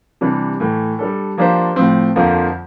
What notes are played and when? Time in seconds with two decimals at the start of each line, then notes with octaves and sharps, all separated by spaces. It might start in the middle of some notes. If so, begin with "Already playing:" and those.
0.21 C3 E3 G3 D4
0.60 A2 E3 A3
0.99 G3 D4 A4
1.38 F3 A#3 D4 G4 C5
1.76 A2 F3 C4
2.16 F2 D3 F3 A#3